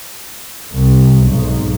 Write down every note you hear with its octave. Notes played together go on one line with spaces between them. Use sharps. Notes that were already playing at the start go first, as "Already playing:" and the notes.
C2
B1 G#2